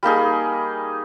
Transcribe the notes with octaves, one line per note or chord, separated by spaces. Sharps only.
G3 A#3 D#4 G#4